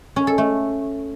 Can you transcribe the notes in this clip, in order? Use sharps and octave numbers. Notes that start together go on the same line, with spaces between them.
C#4
A4
A3